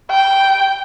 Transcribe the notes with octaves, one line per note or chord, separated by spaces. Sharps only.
G5